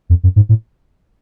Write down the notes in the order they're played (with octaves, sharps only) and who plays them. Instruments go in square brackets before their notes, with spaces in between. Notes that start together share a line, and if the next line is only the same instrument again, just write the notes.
[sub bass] F2
F#2
G#2
A2